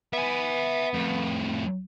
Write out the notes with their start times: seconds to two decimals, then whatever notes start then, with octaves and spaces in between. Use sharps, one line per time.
0.13 B3 E5 G#5
0.93 F2 A2